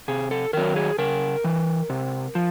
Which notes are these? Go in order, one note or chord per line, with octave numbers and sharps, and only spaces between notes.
C3 G#4
A4
D#3 F#3 A#4
G#4
C#3 A#4
E3
C3
F3